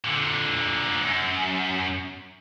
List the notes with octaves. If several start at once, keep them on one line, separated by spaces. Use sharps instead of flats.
A#2 D3
F#2